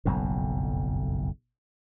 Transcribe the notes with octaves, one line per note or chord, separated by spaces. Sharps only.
F#1 B1 F2 A2